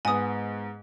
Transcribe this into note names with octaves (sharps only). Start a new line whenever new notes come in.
G#2 B3 G#5 D#6